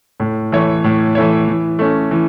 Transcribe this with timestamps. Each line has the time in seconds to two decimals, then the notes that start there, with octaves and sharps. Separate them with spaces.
0.20 A2
0.52 E3 A3 E4 C#5
0.84 A2
1.15 E3 A3 E4 C#5
1.48 E3
1.79 A3 C#4
2.11 E3